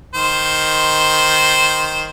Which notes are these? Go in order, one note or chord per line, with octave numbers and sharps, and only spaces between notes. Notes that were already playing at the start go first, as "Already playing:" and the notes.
D#3 C5